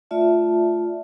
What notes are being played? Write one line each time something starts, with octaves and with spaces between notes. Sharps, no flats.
A3 F4 D5 E5 A5